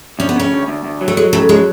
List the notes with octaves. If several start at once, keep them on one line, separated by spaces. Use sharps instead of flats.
D2 C#4
B3
C#3 C#4
D2
D2
D2
F#3
A3
F#3 G#3
C#3 A3
F#3 G#3